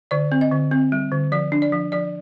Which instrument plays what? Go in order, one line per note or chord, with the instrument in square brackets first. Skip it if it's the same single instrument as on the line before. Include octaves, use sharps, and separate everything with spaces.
[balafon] D3 D5
C4
D#5
D3
C4
G3
D3
F3 D5
D4
D5
F3
F3 D5